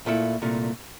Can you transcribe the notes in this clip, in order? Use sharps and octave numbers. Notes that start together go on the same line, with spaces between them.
A#2 A3 E4
C2 A#2 A3